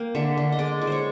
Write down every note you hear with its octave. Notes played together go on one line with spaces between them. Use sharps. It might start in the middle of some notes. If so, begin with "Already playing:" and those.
Already playing: A#3 G5
D3 E5
D3
D#5
G#3 D5
G#3
C5 C#5